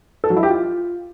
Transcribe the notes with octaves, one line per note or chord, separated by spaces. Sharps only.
A4
F#3
E4
G4
F4